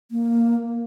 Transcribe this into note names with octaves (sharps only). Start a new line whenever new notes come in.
A#3